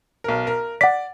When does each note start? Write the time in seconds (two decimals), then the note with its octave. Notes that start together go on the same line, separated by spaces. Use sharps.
0.24 B1 A#4
0.47 A#4
0.81 D5 F#5 D6 B6